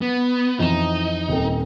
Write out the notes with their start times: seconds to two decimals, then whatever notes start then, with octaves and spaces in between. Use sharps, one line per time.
0.01 B3
0.60 F2 E3 D#4 E7
1.29 D#1 C4 A4